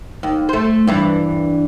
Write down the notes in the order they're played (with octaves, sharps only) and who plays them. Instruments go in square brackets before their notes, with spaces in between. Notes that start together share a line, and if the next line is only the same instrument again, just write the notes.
[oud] D#2
A3 C5
G2 E3 D4